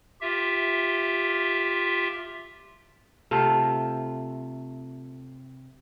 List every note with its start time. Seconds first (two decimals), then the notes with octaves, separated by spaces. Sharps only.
0.21 F4 G4 E5
3.31 C3 A3 F4 A4